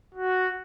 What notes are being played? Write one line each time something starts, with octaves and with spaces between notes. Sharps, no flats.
F#4